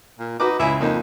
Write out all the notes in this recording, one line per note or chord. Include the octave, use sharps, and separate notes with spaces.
A#2
D#4 F#4 B4 D6
C#2 E4 E5 G#5
F2 A#3 D#4